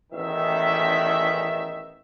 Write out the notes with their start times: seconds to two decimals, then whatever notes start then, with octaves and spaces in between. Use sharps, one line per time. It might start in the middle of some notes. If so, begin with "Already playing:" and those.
0.13 A1 E2 D#3 D#4 E5